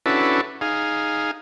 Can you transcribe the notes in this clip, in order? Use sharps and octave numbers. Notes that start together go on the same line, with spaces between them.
C#4 D4 E4 F#4 A4 B4
D#4 G#4 F5